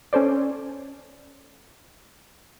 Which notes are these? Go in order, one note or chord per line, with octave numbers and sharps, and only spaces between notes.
C#4 A4 C5 D5